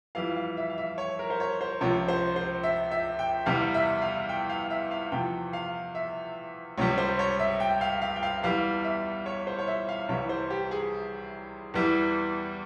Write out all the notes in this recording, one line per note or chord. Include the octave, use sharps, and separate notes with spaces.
F2 E3 G3 F5
F5
E5
F5
E5
C#5
A#4
C5
C#5
C5
C#2 C3 F3 C#5
C5
C5
E5
E5
G5
E2 C3 G3 F5
E5
F5
G5
F5
E5
F5
E2 C3 F3 G5
F5
E5
C#2 C3 G3 C#5
C5
C#5
E5
G5
F5
F5
G5
F5
E2 E3 G3 F5
E5
C#5
C5
C#5
E5
F5
C2 C3 E3 G3 C#5
C5
G4
G#4
E2 E3 G3